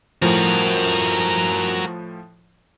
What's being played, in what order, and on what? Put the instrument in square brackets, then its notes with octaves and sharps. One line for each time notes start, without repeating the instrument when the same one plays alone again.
[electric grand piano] A2 F3 [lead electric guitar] F#4 A#4